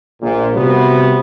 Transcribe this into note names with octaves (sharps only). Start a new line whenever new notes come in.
A#1 A#2
C3 G3 B3 F#4 C5